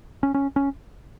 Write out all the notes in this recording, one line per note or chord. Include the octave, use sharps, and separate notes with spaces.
C#4
C#4
C#4